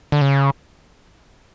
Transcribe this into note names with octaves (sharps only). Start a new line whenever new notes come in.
D3
C#3